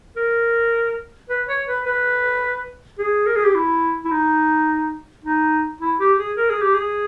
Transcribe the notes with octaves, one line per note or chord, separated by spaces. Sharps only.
A#4
B4
C#5
B4
B4
G#4
A#4
G#4
G4
E4
E4
D#4
D#4
E4
G4
G#4
A#4
G#4
G4
G#4